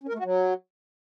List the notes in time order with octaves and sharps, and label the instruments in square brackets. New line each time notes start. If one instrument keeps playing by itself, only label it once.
[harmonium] C#4
A#4
A3
F#4
F#3